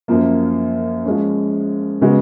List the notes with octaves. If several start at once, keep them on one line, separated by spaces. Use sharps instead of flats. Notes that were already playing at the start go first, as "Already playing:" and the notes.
F#2 F3 A#3
F3 G#3 C#4
C#3 G#3 B3 F#4